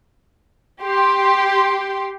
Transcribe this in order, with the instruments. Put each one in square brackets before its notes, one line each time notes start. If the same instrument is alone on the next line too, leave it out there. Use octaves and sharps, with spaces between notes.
[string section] G4 C6